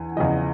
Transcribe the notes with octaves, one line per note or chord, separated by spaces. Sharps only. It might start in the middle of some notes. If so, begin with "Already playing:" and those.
Already playing: E2 G#5
E2 C#3 F3 D#5